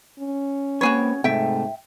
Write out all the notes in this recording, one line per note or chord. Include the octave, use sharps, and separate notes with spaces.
C#4
A#3 C4 F#4 G#4 B4 C#5
G#2 C3 A3 E5 G5